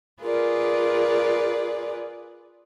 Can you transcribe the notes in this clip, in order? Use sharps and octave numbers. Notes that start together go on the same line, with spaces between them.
F4 G#4 A#4 B4 D5